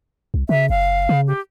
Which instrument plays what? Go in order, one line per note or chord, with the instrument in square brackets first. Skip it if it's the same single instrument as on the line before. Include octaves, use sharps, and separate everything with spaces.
[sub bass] C2
[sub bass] C#3 [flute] E5
[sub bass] F#1 [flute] F5
[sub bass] C#3
[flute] G4